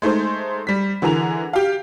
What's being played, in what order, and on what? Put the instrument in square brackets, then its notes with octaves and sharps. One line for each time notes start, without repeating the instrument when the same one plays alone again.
[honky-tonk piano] G#3 A3 D#4 C5
G3 B6
D3 E3 G#4 A#4 F7
G4 F5